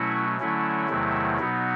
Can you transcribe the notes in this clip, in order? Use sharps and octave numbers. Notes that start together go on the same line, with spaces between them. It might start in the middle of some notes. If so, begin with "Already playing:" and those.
Already playing: B2 F#3 A3 C#4 E4 F#4
D3 F#3 A3 C#4 E4
E2 C3 D#3 F#3 A3
B2 F#3 B3 D#4